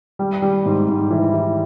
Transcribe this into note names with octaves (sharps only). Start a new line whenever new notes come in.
G3
G3
G#2
G#2
E3
E3